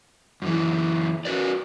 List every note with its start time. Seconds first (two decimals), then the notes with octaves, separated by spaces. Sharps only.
0.42 F#2 E3
1.25 F#4 B4 D5